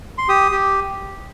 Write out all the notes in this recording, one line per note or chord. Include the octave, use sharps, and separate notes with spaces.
C6
G4 D#6
G4